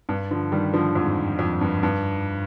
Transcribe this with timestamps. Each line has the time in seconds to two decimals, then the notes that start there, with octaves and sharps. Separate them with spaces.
0.09 G2
0.31 D3 F3
0.52 D#3 G3
0.74 D3 F3
0.95 F2 G#2
1.39 F2
1.61 G2
1.83 G2